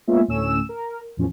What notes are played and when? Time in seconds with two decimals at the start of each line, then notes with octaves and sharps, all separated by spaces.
0.07 G#3 A#3 B3 C#4 F4 E5
0.28 D2 A2 A3 C#4 E6 E7
0.69 A#4
1.17 E2 A2 F3 C#4